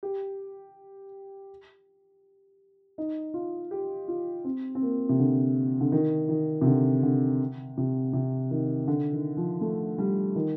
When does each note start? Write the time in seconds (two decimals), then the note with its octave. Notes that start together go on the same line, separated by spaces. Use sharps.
0.03 G4
2.98 D#4
3.34 F4
3.71 G4
4.08 F4
4.44 C4
4.75 C4
4.82 A#3
5.09 C3
5.19 D3
5.81 D3
5.92 D#3
6.29 D#3
6.61 C3
6.66 D3
7.03 D3
7.78 C3
8.13 C3
8.51 D#3
8.88 D3
9.12 D#3
9.37 F3
9.61 A3
9.98 G3
10.36 D#3